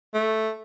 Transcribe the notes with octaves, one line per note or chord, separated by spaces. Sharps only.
A3